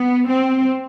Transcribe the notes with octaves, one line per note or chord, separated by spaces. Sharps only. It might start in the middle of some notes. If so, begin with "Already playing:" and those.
Already playing: B3
C4